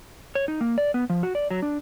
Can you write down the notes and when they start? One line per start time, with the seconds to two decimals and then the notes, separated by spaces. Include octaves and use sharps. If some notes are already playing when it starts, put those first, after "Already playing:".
0.35 C#5
0.48 D#4
0.61 A#3
0.78 D5
0.94 B3
1.10 F3
1.23 F#4
1.35 D5
1.51 F#3
1.62 D4